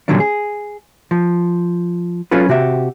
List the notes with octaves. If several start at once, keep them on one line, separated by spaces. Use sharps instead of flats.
A#2 D3 D#3 F#3 G3 D4
G#4
F3
F#3 C#4 F4 A4 B4
C3 F#4 G4 E5